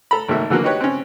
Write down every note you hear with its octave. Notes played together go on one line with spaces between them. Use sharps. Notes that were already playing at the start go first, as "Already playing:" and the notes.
A4 A#5 B5
G#1 A3 A#3 F#4 E5
D3 E3 F#3 A#3
D#4 F#4 G4 B4 C#5
C4 C#4